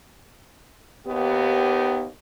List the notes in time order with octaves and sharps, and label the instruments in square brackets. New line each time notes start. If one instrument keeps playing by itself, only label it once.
[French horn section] D#2 B3 G4